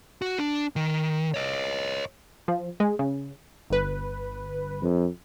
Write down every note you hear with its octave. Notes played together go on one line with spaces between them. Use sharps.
F#4
D4
D#3
C#5 D#5
F3
G#3
C#3
G1 B4
F2